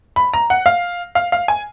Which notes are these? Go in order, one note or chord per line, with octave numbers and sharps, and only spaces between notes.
B5
A#5
F#5
F5
F5
F5
G#5